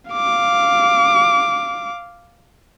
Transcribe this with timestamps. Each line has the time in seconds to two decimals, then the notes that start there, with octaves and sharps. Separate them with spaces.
0.11 F5 D6